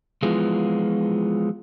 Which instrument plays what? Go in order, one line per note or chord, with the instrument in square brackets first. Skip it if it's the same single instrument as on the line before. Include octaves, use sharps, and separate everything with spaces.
[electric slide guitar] E3 F3 G#3 B3 F4